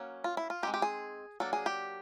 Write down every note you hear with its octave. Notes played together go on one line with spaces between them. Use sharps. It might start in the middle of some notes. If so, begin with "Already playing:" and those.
Already playing: F#3 A#3 C#4
F4
E4
F4
G#3 C4 D#4 G4
G4
G#4
F#3 A#3 D4 A4
G#4
G4